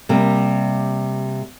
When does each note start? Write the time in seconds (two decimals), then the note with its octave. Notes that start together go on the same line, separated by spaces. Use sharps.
0.09 C3 G3 A#3